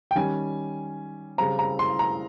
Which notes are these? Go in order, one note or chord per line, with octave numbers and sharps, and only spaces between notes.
G5
D#3 G3 C#4 G#5
C#3 G3 C4 A#5
A#5
C6
A#5